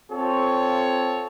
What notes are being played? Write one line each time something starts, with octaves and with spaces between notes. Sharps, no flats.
C4 F4 A4 C#5